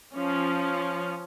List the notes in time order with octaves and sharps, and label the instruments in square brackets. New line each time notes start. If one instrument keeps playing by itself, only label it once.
[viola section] F3 C#4